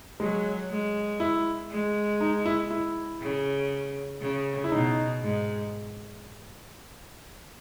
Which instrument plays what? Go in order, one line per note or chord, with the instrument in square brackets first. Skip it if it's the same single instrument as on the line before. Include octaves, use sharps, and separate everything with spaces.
[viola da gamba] F#3 [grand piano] G#3
[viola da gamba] G#3
[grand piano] E4
[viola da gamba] G#3
[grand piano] D#4
E4
E4
[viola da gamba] C#3
C#3
[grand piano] E4
[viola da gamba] B2 [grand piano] D#4
[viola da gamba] G#2